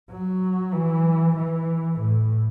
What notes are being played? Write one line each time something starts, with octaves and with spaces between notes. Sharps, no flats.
F#3
E3
E3
A2